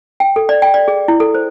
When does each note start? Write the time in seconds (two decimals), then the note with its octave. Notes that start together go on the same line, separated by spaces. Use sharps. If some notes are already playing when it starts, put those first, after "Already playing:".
0.20 G5
0.36 A4
0.49 D5
0.62 G5
0.74 D5
0.88 G#4
1.08 E4
1.20 A4
1.35 C5